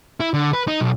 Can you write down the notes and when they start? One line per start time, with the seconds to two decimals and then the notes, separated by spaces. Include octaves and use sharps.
0.20 E4
0.34 D3
0.53 B4
0.68 D#4
0.81 B1